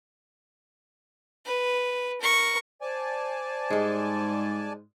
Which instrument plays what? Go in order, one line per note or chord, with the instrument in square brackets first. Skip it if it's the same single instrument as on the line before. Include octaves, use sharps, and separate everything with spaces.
[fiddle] B4
A#4 C#6
[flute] C5 [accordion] D5 G#5 A5
[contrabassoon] G#2 [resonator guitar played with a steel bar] G3 G#3